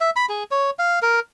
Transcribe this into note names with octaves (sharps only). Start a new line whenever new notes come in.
E5
B5
G#4
C#5
F5
A#4